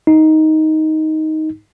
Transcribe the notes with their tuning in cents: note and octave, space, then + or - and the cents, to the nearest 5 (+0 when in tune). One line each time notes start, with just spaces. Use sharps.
D#4 +10